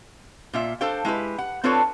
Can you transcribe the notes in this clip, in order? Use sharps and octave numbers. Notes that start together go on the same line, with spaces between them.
A#2 F4 E5
D4 A4 C5 F5 G5
G#3 E4 G4 B4
F#5
C4 D4 F4 A4 B4 C#5